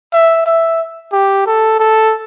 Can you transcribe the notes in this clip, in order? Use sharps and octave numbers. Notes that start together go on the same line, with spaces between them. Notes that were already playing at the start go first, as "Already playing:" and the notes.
E5
E5
G4
A4
A4